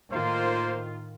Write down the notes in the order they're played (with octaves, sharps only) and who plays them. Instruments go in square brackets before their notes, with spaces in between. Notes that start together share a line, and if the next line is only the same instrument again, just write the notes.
[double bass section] A2 D#3 [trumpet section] A#3 C5 [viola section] F4